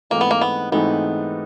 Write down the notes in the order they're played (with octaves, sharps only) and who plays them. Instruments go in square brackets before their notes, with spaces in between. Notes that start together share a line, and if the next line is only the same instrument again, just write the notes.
[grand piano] G#2 E3 A3 C4 D#4 [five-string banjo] A#3
[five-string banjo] B3
A#3
B3
[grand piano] G#2 E3 A3 C4 D#4 [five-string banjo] B3